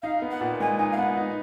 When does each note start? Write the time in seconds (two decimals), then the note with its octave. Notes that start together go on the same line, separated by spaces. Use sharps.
0.03 D#4 F5
0.22 B3
0.31 F#5
0.40 A#2
0.60 G#3 G#5
0.78 D#4 G#5
0.92 F5
0.97 B3 F#5
1.17 D#4